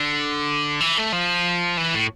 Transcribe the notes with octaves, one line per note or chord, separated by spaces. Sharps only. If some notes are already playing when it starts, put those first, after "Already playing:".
Already playing: D3
E3
A3
F3
E3
A2